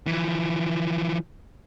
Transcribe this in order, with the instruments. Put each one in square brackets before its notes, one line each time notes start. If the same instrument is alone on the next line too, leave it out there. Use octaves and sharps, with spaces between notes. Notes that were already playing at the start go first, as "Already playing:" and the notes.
[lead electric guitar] E3 F3